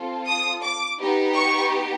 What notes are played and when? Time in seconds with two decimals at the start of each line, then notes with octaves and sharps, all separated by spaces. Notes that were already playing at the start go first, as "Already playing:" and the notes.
Already playing: C4 F4 A4
0.26 D#6
0.63 D6
0.99 B3 D#4 G4
1.35 C#6